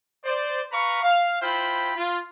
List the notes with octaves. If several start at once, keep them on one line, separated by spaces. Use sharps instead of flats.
C5 D5
B4 F5 A#5 B5 C#6
F5
E4 F4 C5 G5 B5
F4